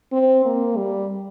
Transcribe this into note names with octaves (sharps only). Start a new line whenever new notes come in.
C4
A#3
G3